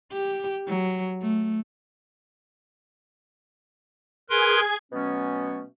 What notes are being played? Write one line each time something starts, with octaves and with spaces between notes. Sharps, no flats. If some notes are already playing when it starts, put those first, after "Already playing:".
G4
F#3
A3
G#4 A#4 B4 C6 G#6
B2 F#3 A3 B3 C#4